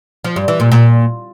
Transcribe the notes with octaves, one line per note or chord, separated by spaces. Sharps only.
F3
G2
E3
A#2
A#2